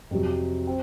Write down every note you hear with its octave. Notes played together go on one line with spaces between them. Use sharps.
F2 C3 F#3
C4